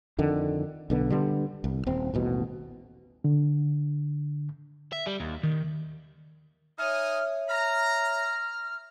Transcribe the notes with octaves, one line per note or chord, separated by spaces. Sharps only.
F2 D3 D#3
B1 D3 B3
D3 G3 G#3 B3
C2
D#1 C4
D#1 A1 B2
D3
E5
G3
D#2
D#3
D#4 C#5 E5 G#5 D#6 F6
A#5 F6